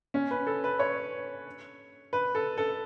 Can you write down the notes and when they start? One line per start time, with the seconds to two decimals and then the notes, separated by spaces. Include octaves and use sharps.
0.14 C#4
0.31 B4
0.47 A4
0.64 B4
0.79 C#5
2.13 B4
2.35 A4
2.58 A4